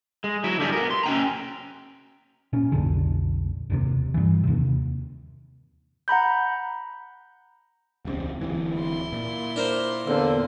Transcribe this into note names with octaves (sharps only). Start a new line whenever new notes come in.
G#3
F#3 E4
D3 G3 E4 G#4
B3 A#4
C6
C#4 G5 A#5
A#2 C#4
B1 F2 A#2 D3
F#1 D#2 C3
G2 E3
D#2 C3
F#5 A#5 B5 G6
E1 C#2 C4
D1 E3
E4 C6
A#2
D4 A#4 C5
E2 D3 A#3 C4